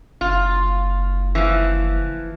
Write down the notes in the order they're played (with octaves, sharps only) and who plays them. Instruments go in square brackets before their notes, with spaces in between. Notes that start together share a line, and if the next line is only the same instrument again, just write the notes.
[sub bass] F#1 [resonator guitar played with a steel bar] F4
[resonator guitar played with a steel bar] E3 F3